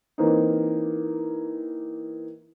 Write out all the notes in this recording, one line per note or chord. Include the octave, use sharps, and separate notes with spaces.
E3 A#3 C4 D#4